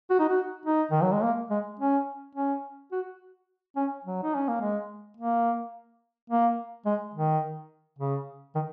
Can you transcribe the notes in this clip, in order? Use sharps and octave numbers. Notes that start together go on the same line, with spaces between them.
F#4
D#4
F#4
D#4
D#3
F#3
G#3
A#3
G#3
C#4
C#4
F#4
C#4
F#3
D#4
C#4
A#3
G#3
A#3
A#3
G#3
D#3
C#3
D#3